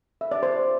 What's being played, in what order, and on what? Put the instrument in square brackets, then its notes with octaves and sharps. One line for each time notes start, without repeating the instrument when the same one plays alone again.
[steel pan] E5
D5
C5